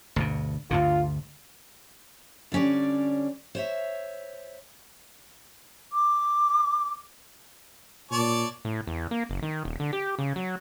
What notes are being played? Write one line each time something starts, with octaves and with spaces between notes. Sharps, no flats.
D2 G2 B2
D2 G2 D3 F4
D3 G3 C#4 C#5 D5
C5 C#5 E5
D6
A#2 C#5 D5 A5
A2
E2
A#3
F#1
D#3
D#1
D3
G4
C#3
F#3